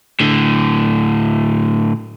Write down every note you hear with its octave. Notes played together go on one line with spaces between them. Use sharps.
A2 D3